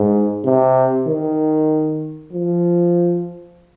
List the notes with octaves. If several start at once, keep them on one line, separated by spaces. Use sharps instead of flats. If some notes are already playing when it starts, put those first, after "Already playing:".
Already playing: G#2
C3
D#3
F3